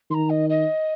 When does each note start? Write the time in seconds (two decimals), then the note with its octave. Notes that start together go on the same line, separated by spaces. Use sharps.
0.10 D#3 C6
0.14 A#5
0.30 D#5
0.50 D#5